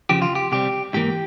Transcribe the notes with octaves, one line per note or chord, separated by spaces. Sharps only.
F2 C#3 F3 G4
F4
G4
C2 C3 G3 C4 G4
G#2 E3 A#3 G4